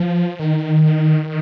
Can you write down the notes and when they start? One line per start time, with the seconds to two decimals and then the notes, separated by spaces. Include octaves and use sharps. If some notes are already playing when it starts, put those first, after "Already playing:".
Already playing: F3
0.39 D#3